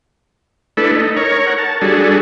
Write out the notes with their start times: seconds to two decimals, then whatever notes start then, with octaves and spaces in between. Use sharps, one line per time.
0.77 A3 D4 E4 A4 B4
0.92 D#4
1.17 A#4 C#5
1.47 A#4 F#5
1.58 A5
1.81 G3 D4 F#4 G#4 A4